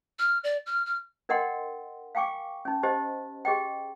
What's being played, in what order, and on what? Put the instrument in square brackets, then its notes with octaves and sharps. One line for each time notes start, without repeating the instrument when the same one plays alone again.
[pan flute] F6
D5
F6
F6
[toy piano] D4 A#4 D#5 F#5 G5 C6
F5 G5 G#5 C#6 D6
C#4 D#4
D#4 G4 C5 D#5
G4 G#4 D#5 G5